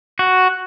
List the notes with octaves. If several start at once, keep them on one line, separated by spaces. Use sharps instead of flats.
F#4